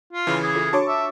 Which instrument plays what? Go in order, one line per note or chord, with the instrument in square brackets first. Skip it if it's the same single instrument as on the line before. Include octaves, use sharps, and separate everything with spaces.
[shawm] F4
[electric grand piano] C#3 E3 [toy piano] A5 B5
[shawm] G#4
[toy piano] F4 A4
[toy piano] D4 F#4 C#5 [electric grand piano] A5 C#6 D6
[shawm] E5